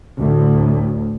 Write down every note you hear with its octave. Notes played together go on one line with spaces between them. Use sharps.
D2 A2